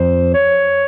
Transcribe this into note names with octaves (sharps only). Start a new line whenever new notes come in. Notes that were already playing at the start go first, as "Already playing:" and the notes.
Already playing: F2 C5
C#5